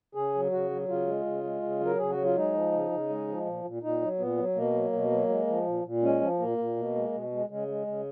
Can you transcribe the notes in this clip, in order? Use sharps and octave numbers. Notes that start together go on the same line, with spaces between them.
C#3 G#4
F#3
C#3 F#4
F#3
C#3 F4
G#3
C#3
G#3
C#3
F#3
A#4
C#3 G#4
F#4
F#3
F4
G#3 D#4
F3
C#3
C#3
G#3
F3
A#2
A#2
A#2 D#4
F#3
A#2 B3
F#3
B2 A#3
F#3
B2
F#3
G#3
F3
A#2
A#2
G#3 C#4
F3
A#2 A#3
A#2
B2
G#3
B2
G#3
C#3 G#3
G#3
C#3